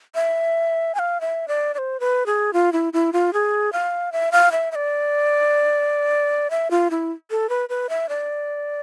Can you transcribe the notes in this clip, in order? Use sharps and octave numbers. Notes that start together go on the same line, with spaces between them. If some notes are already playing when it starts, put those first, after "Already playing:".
E5
G#5
F5
E5
D5
D5
C5
B4
G#4
F4
E4
E4
F4
G#4
F5
E5
F5
E5
E5
D5
E5
F4
E4
A4
B4
B4
E5
D5